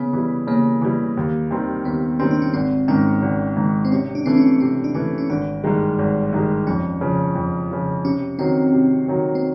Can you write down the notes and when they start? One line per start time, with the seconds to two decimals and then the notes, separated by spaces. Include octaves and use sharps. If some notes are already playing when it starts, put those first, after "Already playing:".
Already playing: C#3 B3
0.13 E3 G3
0.47 C#3 A#3
0.82 E3 G3
1.17 D#2
1.51 D#3 G3 C4
1.85 D#2 B3
2.20 D#3 G3 C4 C#4
2.31 D4
2.42 C#4
2.54 G#1 C4
2.88 G#2 D#3 C#4
3.22 G#1
3.57 G#2 D#3
3.85 C4
3.92 C3 C#4
4.15 D4
4.26 E3 A3 C4
4.37 C#4
4.60 C3 C4
4.84 D4
4.94 E3 A3 C#4
5.18 C#4
5.30 G#1 D4
5.64 G2 D#3 G#3
5.99 G#1
6.33 G2 D#3 G#3
6.67 F2 C#4
7.01 C#3 F3
7.35 F2
7.71 C#3 F3
8.04 C3 C#4
8.39 D#3 F#3 C4
8.73 C3
9.08 D#3 F#3
9.35 C4